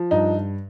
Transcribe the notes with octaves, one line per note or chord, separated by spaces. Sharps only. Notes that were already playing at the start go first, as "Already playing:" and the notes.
Already playing: F3
G2 D#4